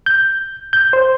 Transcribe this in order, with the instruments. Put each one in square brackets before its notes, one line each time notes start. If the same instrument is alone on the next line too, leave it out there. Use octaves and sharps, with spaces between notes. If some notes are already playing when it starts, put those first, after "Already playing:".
[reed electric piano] G6
G6
C5